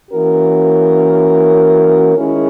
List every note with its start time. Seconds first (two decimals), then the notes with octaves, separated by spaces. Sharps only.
0.11 E3 A#3 C#4 F#4 A#4
2.14 D#3 G#3 C#4 E4 G#4